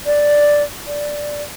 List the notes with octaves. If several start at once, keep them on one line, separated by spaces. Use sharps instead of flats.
D5
D5